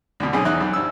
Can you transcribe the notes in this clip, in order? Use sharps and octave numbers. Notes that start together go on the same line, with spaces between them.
D2 B2
B1 B2 C#4 G#4
E2 D#4 E4 F#6
B1
G2 E6